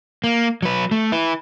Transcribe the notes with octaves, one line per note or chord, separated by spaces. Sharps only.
A#3
F#3 B4
A3
E4 B4